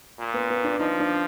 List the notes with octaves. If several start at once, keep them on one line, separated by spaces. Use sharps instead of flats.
A#2
B3
B3
D4
F3 D#4
D4